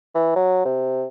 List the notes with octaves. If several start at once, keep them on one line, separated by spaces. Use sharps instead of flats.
E3
F#3
C3